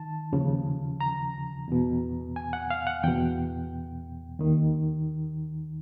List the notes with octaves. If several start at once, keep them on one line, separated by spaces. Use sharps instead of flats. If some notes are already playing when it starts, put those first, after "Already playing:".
Already playing: D#3 A5
D#2 C#3 F3
A#5
E2 B2
G#5
F#5
F5
F#5
E2 B2 G5
D#2 D#3